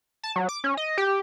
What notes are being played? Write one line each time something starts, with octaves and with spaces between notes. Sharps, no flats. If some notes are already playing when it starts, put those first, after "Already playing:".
A5
F#3
D6
C#4
D#5
G4